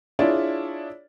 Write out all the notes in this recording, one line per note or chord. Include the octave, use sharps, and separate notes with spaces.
D4 E4 F4 G#4 C#5 D5